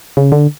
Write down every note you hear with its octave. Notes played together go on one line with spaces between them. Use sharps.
C#3
D3